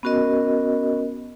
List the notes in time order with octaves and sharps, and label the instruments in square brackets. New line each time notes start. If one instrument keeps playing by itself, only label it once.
[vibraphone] B3 C#4 F#4 A#4 D#5